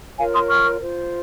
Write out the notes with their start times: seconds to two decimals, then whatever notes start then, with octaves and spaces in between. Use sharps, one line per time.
0.18 F4 A#4 C#5 F5 G#5
0.33 C6 D#6
0.48 C#6 F6
0.79 F4 C5